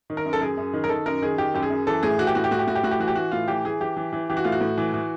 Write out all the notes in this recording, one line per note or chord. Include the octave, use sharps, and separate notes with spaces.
D#3
A#4
F#2
A4
F#2 G#4
F#2
D#3
A#4
D#3 A4
F#2 A#4
D#3 G#4
D#3 G4
F#2 G4
G#4
F#2
E3 A4
A2 G#4
E3 F#4
G4
A2 F#4
G4
A2 F#4
G4
A2 F#4
G4
A2 F#4
G4
E3 F#4
G4
E3 F#4
A2 F4
E3 G4
E3 G#4
E3 G4
E3
E3
E3 G4
F#4
A2 F4
F#4
A2
E3
E3